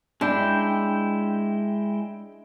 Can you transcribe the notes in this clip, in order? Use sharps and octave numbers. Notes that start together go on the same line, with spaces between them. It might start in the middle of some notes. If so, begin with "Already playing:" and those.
G#3 D4 E4 G5